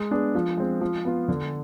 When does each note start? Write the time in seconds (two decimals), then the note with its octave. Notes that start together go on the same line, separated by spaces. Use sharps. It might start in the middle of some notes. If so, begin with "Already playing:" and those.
Already playing: G#3
0.11 B3 D4 G#4
0.35 F3
0.57 G#3 C4
0.81 F3
1.05 B3 F4
1.28 D3